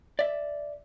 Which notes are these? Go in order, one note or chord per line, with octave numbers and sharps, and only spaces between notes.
D5 E5